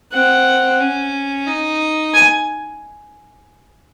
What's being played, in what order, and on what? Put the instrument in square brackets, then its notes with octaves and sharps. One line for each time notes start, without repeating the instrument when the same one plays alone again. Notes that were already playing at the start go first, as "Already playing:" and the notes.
[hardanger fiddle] C4 [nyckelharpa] F#5
[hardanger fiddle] C#4
D#4
[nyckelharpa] G#5